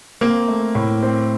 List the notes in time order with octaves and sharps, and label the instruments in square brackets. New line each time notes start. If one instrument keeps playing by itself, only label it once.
[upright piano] A#3 [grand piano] C4
[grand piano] A3
A2
C4